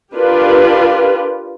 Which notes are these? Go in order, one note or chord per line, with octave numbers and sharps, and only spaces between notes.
D4 F4 G4 A#4 B4